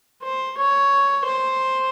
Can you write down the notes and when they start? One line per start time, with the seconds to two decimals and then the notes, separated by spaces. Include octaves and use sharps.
0.22 C5
0.57 C#5
1.25 C5